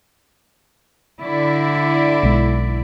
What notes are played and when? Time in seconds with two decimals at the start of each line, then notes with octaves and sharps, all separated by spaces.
1.21 D3 E4 D5
2.23 B1 G#3